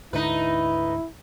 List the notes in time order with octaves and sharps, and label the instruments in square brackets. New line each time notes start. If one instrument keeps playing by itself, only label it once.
[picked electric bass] D2 G#2 D3 [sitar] D#4 B4 [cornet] E4